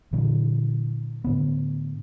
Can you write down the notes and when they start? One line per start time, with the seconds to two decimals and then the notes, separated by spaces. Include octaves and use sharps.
0.13 A#2 D3 E3 F#3
1.24 A2 D3 B3